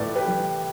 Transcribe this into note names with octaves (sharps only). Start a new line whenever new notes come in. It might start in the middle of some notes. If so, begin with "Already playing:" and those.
Already playing: A2 E3 B4 D5
G4 B4
E3